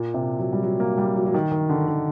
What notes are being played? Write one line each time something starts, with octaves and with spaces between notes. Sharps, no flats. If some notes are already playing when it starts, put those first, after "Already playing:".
Already playing: A#2
C3
F#3
G3
F#3
A#3
G3
F#3
F#3
D#3
D#3
D3
D#3